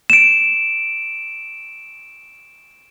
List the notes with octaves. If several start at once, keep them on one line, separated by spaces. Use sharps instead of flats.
D7 E7